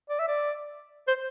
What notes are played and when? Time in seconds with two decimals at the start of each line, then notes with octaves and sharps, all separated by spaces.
0.10 D5
0.19 E5
0.28 D5
1.08 C5